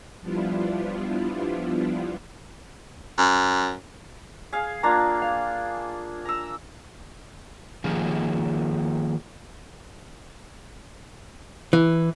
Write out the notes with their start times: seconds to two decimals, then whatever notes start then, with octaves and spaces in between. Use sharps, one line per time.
0.21 F3 G3 B3 D4 E4 F4
3.18 F#2
4.53 G#4 F5
4.83 A#3 D4 F4 A#5
5.22 F5
6.25 A#5 E6
7.84 D#3 F3 A#3 G4 G#4
11.73 E3